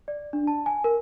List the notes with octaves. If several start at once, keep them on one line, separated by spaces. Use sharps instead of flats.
D5
D4
A5
G#5
A#4